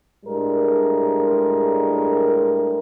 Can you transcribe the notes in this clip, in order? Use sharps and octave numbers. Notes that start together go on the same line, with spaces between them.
A2 G3 G#3 D4 A#4